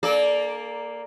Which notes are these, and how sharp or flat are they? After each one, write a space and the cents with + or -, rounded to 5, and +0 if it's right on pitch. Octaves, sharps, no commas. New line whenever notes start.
A#3 +0 A4 -40 D5 +0